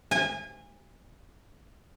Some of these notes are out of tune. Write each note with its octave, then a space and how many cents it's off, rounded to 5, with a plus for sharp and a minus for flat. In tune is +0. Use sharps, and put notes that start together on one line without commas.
G#5 -30